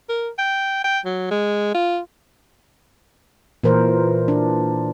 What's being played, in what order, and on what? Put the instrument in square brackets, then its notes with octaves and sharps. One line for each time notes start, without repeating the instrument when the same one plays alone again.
[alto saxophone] A#4
G5
G5
F#3
G#3
F4
[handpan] A#2 E3 A#4 C5
D4